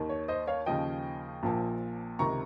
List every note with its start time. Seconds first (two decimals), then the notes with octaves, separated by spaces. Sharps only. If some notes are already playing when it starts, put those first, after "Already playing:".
Already playing: D#2 D#3
0.09 C#5
0.28 C5 D#5
0.47 C#5 F5
0.66 D#2 C#3 F3 D#5 G5
1.43 A#1 A#2 F3
2.19 C#2 C3 D#3 A#5 C#6